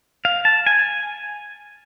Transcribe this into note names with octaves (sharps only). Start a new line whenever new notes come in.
F5
A5
G#5